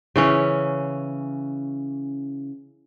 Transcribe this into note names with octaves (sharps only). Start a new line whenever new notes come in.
C#3 E3 C#4